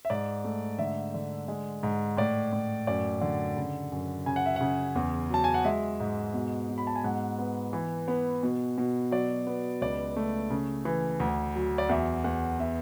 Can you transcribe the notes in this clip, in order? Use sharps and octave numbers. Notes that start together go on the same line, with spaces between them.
E5
G#2 D5
A3
D3 E5
D3
G#3
G#2
A2 D5
A2
F#2 D5
D3
C#3
F#2
C#3 G#5
F#5
E5
C#3 F#5
E2
F#3 A5
G#5
F#5
G#3 E5
G#2
B2
B2
B5
A5
G#5
G#2 F#5
B3
E3
B3
B2
B2
F#3 D5
B3
C#2 D5
A3
C#3
E3
D2
F#3
D5
E2 E5
E2 F#5
B3 E5